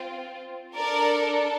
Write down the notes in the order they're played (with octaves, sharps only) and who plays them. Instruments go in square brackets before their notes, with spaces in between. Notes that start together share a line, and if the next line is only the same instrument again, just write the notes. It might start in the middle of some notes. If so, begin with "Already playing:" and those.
Already playing: [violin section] C4 F4
D4 A4 A#4 D5